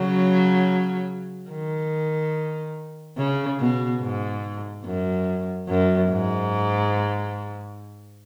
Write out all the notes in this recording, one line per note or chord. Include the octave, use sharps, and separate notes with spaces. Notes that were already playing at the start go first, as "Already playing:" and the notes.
Already playing: C#3 F#3
D#3
C#3
B2
G#2
F#2
F#2
G#2